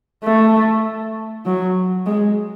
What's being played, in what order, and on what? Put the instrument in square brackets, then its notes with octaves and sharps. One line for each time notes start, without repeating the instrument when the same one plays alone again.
[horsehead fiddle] A3
F#3
G#3